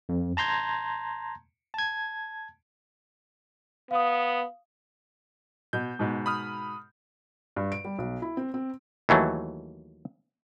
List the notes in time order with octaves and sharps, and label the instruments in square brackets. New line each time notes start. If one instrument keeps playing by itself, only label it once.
[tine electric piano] F2
A5 A#5 C6 G6 G#6
A5 G#6
[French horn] B3 [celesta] F5 D#6
[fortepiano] B2 [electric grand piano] G6
[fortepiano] G#2 B2
[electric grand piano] B5 D#6 F6
[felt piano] G2
D7
G3
B1
E4
C4
C4
[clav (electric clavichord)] D#2 E3 F#3 A3